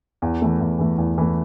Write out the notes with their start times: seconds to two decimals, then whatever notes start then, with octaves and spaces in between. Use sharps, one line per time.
0.22 E2
0.42 E3 A3
0.60 E2
0.79 E3 A3
0.98 E2
1.18 E3 A3